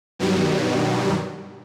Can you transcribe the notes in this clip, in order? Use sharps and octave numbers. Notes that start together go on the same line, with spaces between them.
G2 B2 D#3 F#3 G3